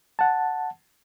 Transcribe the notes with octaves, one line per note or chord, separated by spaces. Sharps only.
F#5 A5